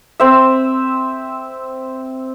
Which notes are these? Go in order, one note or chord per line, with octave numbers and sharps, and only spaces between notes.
C4 E5